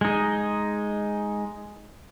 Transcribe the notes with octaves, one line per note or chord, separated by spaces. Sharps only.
G#3 D#4